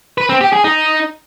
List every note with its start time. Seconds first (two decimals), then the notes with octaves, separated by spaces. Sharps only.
0.18 B4
0.29 C4
0.41 G4
0.53 G#4
0.64 D#4